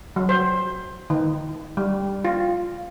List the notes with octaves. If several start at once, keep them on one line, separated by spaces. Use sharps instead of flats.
F#3
C5
D#3
G3
F4